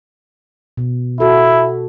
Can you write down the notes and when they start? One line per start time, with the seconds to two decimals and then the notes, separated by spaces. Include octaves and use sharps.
0.77 B2
1.20 E4 F#4 A4